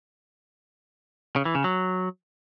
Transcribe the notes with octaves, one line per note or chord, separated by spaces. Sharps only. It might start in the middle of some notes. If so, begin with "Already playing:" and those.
C#3
E3
C#3
F#3